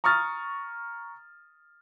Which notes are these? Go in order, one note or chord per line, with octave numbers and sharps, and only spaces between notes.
A#5 C#6 D#6 F6 A6